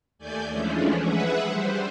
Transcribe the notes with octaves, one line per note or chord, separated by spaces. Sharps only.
D#2 A3 D5 G#5 G6
E3 F3 G#3 A3 C#4 D4
G#4 B4 E5 F#5
G3 C5